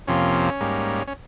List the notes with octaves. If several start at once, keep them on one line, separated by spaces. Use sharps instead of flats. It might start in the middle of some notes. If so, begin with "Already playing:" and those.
F2 C3 F3 A#3 C#4
G#2 G3 A#3
C#4